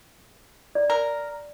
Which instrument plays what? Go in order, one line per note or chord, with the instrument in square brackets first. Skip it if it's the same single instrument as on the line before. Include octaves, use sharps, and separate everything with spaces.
[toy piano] D5
[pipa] A#4